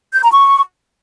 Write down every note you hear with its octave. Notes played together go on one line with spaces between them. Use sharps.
G6
A#5
C#6